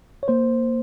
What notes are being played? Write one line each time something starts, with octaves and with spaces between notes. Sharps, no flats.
C#5
A#3 C5